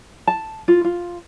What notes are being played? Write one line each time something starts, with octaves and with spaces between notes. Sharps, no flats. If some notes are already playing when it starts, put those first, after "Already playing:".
A5
F4
F4